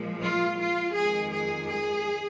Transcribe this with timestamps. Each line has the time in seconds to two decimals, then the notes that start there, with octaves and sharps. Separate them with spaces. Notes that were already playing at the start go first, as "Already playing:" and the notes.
Already playing: A#2 F3 G#3
0.21 F4
0.58 F4
0.94 F2 D#3 G#3 G#4
1.31 G#4
1.67 G#4